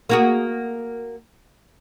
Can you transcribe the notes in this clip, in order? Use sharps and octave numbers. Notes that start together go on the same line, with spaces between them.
A#3 F#4 G#4